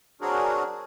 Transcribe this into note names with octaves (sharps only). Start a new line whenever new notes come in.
F#3 C4 D4 F#4 G#4 A#4